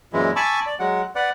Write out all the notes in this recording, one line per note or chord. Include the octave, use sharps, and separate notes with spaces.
F#2 A#2 E3 G#3 E4
G#5 A5 B5 C#6 D6 E6
D5
F#3 G#3 F#5
B4 D5 F#5